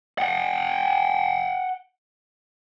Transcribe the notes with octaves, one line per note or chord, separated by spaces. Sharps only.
F#5 G5